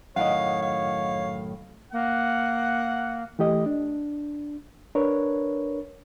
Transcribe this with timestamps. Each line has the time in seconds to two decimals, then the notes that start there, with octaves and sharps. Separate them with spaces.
0.16 F#2 A2 D#3 C#5 D#5 F5 F#5
0.62 F5
1.93 A#3 F#5
3.39 E3 A3 G4 D#5
3.66 D4
4.95 D4 A#4 B4 C#5